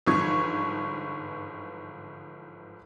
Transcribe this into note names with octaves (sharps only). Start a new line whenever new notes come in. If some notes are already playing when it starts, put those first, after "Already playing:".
G1 G#2 E3 F3 C#6 G#6